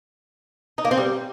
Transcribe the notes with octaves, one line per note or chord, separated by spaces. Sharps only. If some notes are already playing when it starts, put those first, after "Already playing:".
D#4
A#3
C4
G3